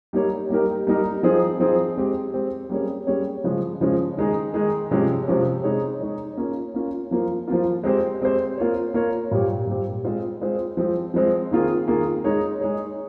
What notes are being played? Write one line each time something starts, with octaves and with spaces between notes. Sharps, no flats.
G3 A#3 D#4 G4 C#5
G3 A#3 D#4 G4 A#4
G3 A#3 D#4 G4 A#4
F3 C4 D#4 G#4
F3 C4 D#4 G#4
G#3 C4 G4
G#3 C4 G4
G3 A#3 C#4 G#4 C#5
G3 A#3 C#4 G#4 C#5
C#3 F3 G#3 C#4
C#3 F3 G#3 C#4
D#3 G#3 D#4 G#4
D#3 G#3 D#4 G#4
C3 F3 G#3 C#4 G4
C3 F3 G#3 C#4 G4
G#3 D#4 G#4 C#5
G#3 D#4 G#4 C#5
A#3 C#4 F4
A#3 C#4 F4
F3 A#3 F4
F3 A#3 F4
G#3 C4 G4 C5
G#3 C4 G4 C5
A#3 F4 A#4 C#5
A#3 F4 A#4 C#5
A#2 G3 C4 G4
A#2 G3 C4 G4
G#3 C4 F4 C5
G#3 C4 F4 C5
F3 G#3 C4
F3 G#3 C4
D#3 A#3 F4 G#4
D#3 A#3 F4 G#4
G#3 D#4 G#4 C#5
G#3 D#4 G#4 C#5